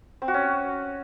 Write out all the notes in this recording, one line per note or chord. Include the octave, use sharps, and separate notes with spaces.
C4
F#4
C#4